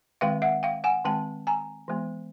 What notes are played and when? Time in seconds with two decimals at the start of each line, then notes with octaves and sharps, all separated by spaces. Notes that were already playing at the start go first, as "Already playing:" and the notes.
0.21 D#3 G#3 C4 F5 G5
0.42 E5 F#5
0.63 F5 G5
0.84 F#5 G#5
1.05 D#3 G#3 C4 G5 A5
1.47 G#5 A#5
1.88 E3 G#3 B3